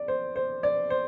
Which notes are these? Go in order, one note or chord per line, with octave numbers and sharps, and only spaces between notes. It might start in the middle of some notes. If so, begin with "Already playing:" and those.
Already playing: D5
C5
C5
D5
C5